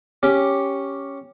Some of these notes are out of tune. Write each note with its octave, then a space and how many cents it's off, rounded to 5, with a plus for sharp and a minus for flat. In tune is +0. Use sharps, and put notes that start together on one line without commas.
C#4 +0 G4 +0